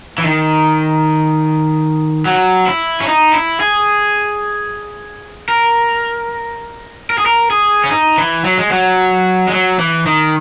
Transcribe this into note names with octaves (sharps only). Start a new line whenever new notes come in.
E3
D#3
F#3
E4
C#4
D#4
E4
G#4
A#4
A#4
G#4
A#4
G#4
C#4
D#4
E3
F#3
G#3
F#3
G#3
F#3
E3
D#3